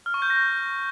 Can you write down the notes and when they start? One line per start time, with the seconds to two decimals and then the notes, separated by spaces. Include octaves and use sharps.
0.06 F6
0.14 C#6
0.22 G6
0.30 A#6